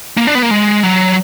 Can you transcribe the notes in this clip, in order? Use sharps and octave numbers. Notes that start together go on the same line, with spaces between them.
A#3
D4
B3
A#3
G#3
F#3